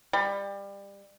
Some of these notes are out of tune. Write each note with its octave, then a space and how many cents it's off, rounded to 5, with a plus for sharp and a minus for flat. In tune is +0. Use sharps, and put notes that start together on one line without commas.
G3 +25